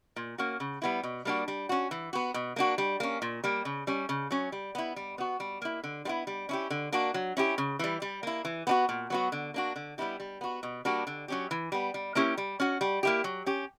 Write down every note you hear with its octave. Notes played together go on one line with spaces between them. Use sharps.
A#2
A#3 C#4 F#4
C#3
G3 B3 E4
B2
G3 A#3 D4 F#4
G3
C#4 F#4
E3
B3 F#4
B2
A#3 D4 F#4
G3
A#3 C#4
A#2
G3 A#3
C#3
G3 C#4
C#3
F#3 C#4
G3
B3 E4
G3
B3 F#4
G3
A#3 E4
D3
G3 B3 E4
G3
C#4 E4 G4
D3
A#3 D4 F#4
F#3
C#4 E4 G4
C#3
E3 G3
G3
A#3 E4
E3
B3 D4 F#4
A#2
F#3 B3 F#4
D3
A#3 D4 F#4
D3
G3 B3 E4 G4
G3
B3 F#4
B2
G3 A#3 D4 F#4
D3
F#3 C#4 G4
E3
G3 B3
G3
A#3 C#4 E4 G4
G3
C#4 F#4
G3
A#3 E4 G4
F#3
C#4 G4